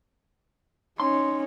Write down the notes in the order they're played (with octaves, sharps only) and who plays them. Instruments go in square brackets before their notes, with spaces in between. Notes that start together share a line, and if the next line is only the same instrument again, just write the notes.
[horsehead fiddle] C#4 D#4 [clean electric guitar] C6